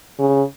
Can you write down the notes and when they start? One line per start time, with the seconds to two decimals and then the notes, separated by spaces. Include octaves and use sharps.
0.19 C#3